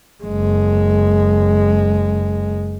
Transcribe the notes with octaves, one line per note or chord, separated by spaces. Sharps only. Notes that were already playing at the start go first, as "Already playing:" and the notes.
F#1 G#3